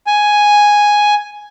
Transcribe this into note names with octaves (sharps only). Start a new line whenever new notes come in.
G#5